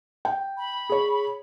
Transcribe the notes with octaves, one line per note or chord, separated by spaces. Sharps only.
G5
B5
G#4 C#5